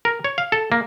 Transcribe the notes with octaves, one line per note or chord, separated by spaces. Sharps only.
A#4
C#5
F5
A4
A#3